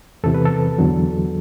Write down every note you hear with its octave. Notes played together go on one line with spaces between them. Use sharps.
E2 C3 E3 A4
B4
A4
E2 D3 F#3